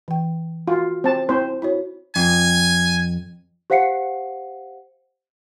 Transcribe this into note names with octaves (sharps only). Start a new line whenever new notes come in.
E3 G5
F4 F#4
C4 C5 A5
C4 E4 C5
E4 F#4 C#5
F2 G#5
G4 C5 F5 F#5 C7 C#7